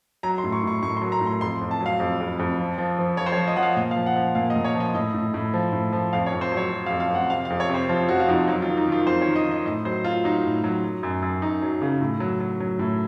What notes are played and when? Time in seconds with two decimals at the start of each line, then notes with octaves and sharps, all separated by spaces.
0.23 F#3 A#5
0.38 C6
0.44 A2
0.52 C#6
0.63 A2 C#6
0.83 A2 C#6
0.97 C6
1.01 F#3
1.12 A#5
1.21 A2
1.26 C6
1.41 F2 C6
1.61 F2
1.71 A5
1.80 F#3
1.86 F5
2.00 F2
2.20 F2
2.39 F2
2.59 F3
2.78 F3
2.99 F3
3.17 F3 C#5
3.26 C5
3.32 C#5
3.37 F3
3.48 D#5
3.56 F3 F#5
3.63 F5
3.76 A#2 D#5
3.91 F5
3.96 F3
4.06 F#5
4.16 F3
4.35 A#2 F5
4.50 D#5
4.56 A#2
4.65 C#5
4.75 F3
4.80 D#5
4.95 A2 D#5
5.14 A2
5.34 A2
5.54 F3
5.72 A2
5.93 F3
6.13 F2 F5
6.26 C#5
6.32 F2
6.41 C5
6.51 F#3
6.57 C#5
6.72 F#3
6.86 F5
6.90 F2
7.00 F5
7.10 F2 F#5
7.30 C3 F5
7.45 F5
7.50 F2
7.60 C#5
7.69 C3 C5
7.89 F3 F4
8.08 F2 F#4
8.19 F4
8.28 F2 D#4
8.48 F#3 D#4
8.62 F4
8.67 D#3
8.77 D#4
8.87 D#3
8.92 F4
9.07 F2 C5
9.21 C#5
9.26 D#3
9.36 D#5
9.46 D#3
9.51 D#5
9.66 A2 D#5
9.85 F#3 C5
10.05 F#3 F4
10.24 F#3 D#4
10.45 A2
10.64 F#3
10.84 F#3
11.03 F#2
11.22 F#2
11.42 F#2 D#4
11.62 F#3
11.82 C#3
12.01 A2
12.20 F#3
12.40 F#3
12.60 F#3
12.79 A2